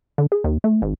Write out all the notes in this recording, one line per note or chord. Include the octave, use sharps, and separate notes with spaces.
D3
G#4
D#2
A3
G#1